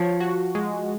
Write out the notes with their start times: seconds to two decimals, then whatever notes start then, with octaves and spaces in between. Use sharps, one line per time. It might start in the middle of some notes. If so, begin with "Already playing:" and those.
Already playing: F3 C#5
0.20 F#4
0.55 G#3